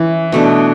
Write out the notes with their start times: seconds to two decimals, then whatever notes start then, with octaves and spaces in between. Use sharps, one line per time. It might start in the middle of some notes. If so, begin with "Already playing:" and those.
Already playing: E3 C#4
0.32 B2 A3 D4